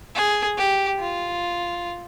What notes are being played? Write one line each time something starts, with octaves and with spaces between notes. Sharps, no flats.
G#4
G4
F4